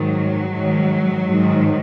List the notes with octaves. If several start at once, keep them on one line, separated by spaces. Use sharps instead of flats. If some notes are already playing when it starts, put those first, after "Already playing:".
Already playing: G#2 D#3 F#3
G#2 D#3
G#2 D#3